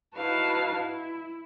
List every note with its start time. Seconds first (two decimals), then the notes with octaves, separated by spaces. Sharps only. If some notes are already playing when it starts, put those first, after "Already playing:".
0.15 D#4 E4 F#4 B4 F5 A5
0.72 E4